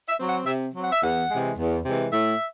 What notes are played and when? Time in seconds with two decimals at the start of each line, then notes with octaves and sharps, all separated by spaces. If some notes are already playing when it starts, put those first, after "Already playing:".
0.09 E5
0.19 F#3 C4
0.27 F#5
0.46 C3 E5
0.74 F#3 C4
0.84 F#5
0.92 E5
1.02 E2 F#5
1.30 C3 E3 G#3
1.58 E2
1.85 C3 E3 G#3
2.13 A2 E5